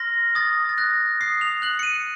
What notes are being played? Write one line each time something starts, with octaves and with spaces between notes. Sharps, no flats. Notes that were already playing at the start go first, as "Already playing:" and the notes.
Already playing: C6 F6 A#6
D#6 A6
A6
F#6 A#6
D#6 C7
F7
F#6 F#7
C#7
D#7